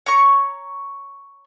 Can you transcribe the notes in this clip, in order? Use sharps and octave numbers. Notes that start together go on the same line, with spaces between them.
C#5 A#5 C#6